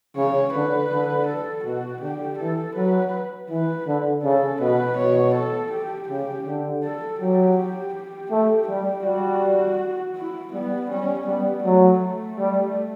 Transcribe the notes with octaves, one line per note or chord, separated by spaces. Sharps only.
C#3 C#5
D3 B4
D3
A4
B2 F#4
D3 G4
E3 A4
F#3 B4
E3 B4
D3
C#3 A4
B2 B4
B2 C#5
A4
G4
C#3 G4
D3
A4
F#3 G4
G4
G4
A3 G4
G3 G4
G3 F#4
E4
G3 B3
G3 C#4
G3 B3
F#3 A3
A3
G3